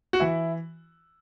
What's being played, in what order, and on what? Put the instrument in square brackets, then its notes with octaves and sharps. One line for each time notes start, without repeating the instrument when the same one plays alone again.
[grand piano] F#4
E3 E4